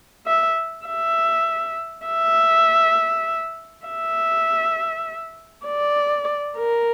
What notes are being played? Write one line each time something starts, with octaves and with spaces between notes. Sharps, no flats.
E5
E5
E5
E5
D5
A#4